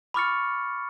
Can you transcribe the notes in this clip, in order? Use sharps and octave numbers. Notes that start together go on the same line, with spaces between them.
B5 C#6 D6 F6 A6 C#7